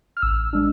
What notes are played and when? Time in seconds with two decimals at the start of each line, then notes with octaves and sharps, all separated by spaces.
0.17 F6
0.22 A1 E6
0.53 G#3 D4